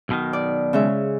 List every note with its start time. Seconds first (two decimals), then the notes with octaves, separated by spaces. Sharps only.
0.09 B1 B2 D#3
0.33 D5
0.73 C#3 G#3 E5